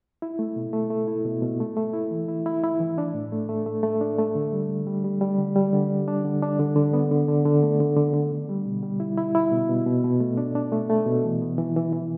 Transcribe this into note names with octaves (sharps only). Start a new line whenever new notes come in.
E4
A3
B2
A3
A3
E4
B2
B2
A3
A3
E4
E3
E4
E4
E4
E3
D4
A2
A3
A3
A3
A3
D4
A3
D3
G3
D3
G3
G3
G3
D3
G3
D3
D4
D4
D3
D4
D3
D3
B3
D3
D3
D3
A3
D3
D3
D3
D3
G3
B2
G3
E4
E4
E4
B2
B2
B2
B2
A3
D4
D4
A3
A3
B2
E3
B3
E3
E3
E3